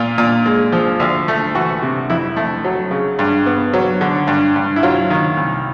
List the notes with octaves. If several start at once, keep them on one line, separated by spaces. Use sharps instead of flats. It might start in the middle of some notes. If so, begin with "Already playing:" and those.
Already playing: A#2 F4
A#2
G#3
F3
D2
A3
E3 F#4
C3
F2 E4
A3
F#3
C#3
G2
B3
F#3
D3
G2
G2
E4
F#3 F4
D#3
C2